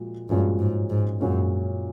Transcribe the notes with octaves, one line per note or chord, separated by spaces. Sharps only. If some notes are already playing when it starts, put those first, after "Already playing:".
Already playing: A#2 F3 G#3 F#4
G2 A#2 F3 G#3 C#4 F#4
G#2
G#2
F#2 A#2 F3 G#3 C#4 F#4